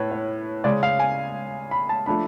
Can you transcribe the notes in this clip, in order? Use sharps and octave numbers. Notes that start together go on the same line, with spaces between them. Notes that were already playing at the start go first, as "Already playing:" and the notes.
Already playing: A2 B4 C#5
C#5
C#3 G#3 C#4 D5
F5
G#5
B5
A5
F3 A3 D4 B5